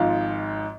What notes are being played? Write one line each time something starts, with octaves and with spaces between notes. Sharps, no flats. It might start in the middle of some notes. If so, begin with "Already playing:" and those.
Already playing: G#1 G#2 F3 F4